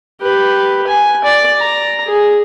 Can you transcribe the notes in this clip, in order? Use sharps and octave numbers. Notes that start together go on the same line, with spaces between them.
G4 B4
G#5
D5
A#5
G#4